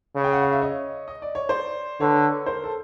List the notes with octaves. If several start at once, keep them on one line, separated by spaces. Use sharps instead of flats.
C#3
G5
F#5
F5
E5
C#5 D#5
D#5
D5
C#5
C5 D5
D3 B4 C#5
A#4 C5
A4